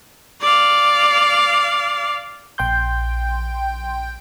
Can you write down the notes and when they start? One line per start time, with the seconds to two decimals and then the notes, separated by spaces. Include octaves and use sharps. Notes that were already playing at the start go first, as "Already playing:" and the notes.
0.41 D5 F5
2.58 A#1 G5 C6 G6